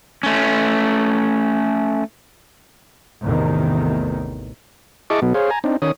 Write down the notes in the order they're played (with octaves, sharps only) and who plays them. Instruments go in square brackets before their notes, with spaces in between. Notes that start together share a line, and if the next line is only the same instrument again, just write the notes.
[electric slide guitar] A3 C#4
[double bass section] A1 E2 A2 C3 D#3
[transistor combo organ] E4 G#4 D#5 A5 C#6 D6
B2 F#3 B3
G#4 C5 C#5 F5
G#5 A#5
C4 D4 D#4
D#3 C#4 C#5 D#6